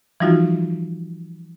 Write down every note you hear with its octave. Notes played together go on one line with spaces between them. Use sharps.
E3 F3 G3 D#4 F4 F#4